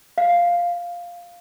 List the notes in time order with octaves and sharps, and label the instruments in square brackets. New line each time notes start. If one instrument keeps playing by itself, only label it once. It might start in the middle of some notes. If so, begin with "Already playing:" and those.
[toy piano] F5